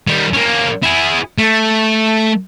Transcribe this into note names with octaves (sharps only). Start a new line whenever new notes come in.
D#3 G3
A#3 C#4
E4 G#4
A3